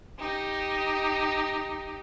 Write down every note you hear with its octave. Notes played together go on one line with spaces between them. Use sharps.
D#4 G4